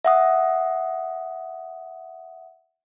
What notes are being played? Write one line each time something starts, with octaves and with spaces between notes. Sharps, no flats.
E5 F#5 D#6